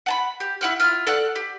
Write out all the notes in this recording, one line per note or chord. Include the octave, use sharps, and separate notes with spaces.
F#5 A5 B5
G4
E4 F#5 F6
E4 F4 F6
A4 D5 F#5 F#6
G4